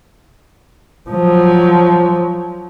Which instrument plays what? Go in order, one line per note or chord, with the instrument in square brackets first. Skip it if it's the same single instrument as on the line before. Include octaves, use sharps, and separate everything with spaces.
[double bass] F3 F#3